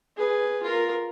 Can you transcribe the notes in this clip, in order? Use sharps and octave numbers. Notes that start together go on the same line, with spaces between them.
G#4 B4
F4 A#4